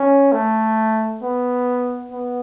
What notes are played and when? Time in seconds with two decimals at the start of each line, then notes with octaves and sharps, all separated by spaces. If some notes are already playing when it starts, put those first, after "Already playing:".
Already playing: C#4
0.32 A3
1.22 B3
2.11 B3